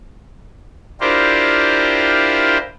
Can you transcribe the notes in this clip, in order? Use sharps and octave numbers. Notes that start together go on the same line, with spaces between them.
D4 E4 F4 G4 A#4 C5